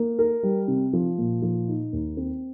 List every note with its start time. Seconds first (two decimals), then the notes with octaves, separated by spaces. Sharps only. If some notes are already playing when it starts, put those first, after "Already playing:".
Already playing: A#3
0.19 A#4
0.43 G3
0.68 C3
0.93 F3
1.18 A#2
1.42 F3
1.68 D#4
1.93 D#2
2.17 C4